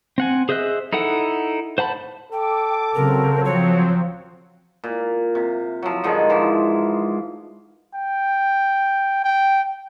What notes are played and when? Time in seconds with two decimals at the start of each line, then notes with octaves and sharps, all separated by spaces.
0.18 C4 F#5 G#5
0.49 G#4 C5 D#5 E5 F#6
0.93 D#4 E4 A4 F#5
1.78 C5 F#5 A5 B5
2.32 A4 G5 D6
2.95 C#3 F#3 C4 A#4
3.45 F3 C#5
4.84 A#2
5.35 C3
5.83 F3 F#3
6.04 G#2 D3 D#3 G#3
6.30 E3 F3
7.94 G5
9.24 G5